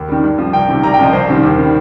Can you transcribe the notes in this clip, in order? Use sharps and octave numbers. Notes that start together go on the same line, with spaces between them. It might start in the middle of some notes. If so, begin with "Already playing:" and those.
Already playing: D#2
D#3 G3
G2
F3
C2 G5
C3 D#3
C2 A#5
G5
A#2 F3 D#5
C2 C5
C3 D#3 G3
D#2
D#3 G3